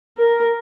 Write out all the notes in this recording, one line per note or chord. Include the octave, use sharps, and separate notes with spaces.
A#4